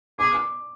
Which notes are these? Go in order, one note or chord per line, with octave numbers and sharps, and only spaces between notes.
G#4 D6